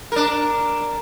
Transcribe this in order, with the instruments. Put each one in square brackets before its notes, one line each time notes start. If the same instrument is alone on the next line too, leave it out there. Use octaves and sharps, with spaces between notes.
[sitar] D4 A#4